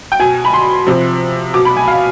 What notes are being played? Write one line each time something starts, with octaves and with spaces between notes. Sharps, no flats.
G5
B2 G#5
B5
C6
C3 F3
B2 D6
B5
G#5
F5